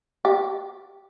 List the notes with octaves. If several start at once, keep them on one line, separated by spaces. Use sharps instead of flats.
G4